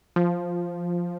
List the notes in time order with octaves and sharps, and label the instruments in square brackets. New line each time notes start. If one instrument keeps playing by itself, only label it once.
[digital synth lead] F3